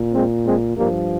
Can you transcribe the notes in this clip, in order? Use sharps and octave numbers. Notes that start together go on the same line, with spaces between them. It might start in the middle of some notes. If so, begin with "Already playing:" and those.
Already playing: A#2
G#3 C4
G#3 C4
G2 F3 G3 A#3